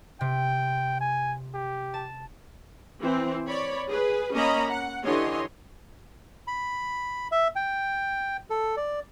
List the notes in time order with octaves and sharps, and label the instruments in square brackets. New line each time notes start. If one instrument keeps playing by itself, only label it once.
[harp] C3 [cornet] G5
[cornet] G#5
G4
[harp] A5
[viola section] E3 C4
C#5 D5 B5
G#4 B4
A#3 C#4 D#5 A#5 B5
F#5
D3 E3 G4 C#5 D#5 C6
[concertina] B5
E5
G5
A4
D5